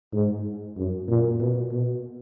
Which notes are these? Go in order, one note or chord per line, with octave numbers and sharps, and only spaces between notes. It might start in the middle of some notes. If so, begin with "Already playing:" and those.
G#2
F#2
A#2
B2
B2